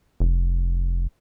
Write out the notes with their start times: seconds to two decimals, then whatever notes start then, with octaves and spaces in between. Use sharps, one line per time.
0.20 F1